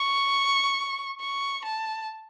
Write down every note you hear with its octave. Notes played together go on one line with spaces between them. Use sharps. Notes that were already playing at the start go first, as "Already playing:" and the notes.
Already playing: C#6
C#6
A5